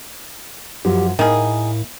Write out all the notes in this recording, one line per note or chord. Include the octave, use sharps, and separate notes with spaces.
F#2 F3 F#4 G4
A2 D#3 A#3 E4 G#4